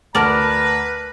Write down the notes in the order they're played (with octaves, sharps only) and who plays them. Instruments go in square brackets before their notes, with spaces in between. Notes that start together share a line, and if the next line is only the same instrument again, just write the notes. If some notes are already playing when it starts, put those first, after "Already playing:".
[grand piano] D2 A5 F6 [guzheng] A#4 D5 [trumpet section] B4 [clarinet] A#5